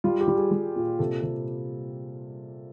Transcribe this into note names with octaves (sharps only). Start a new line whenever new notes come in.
G3 F4
G4
G3
G#4
G3
A#2
C3 A4
C3